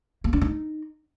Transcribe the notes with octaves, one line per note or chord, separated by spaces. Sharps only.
A#3
D4
D#4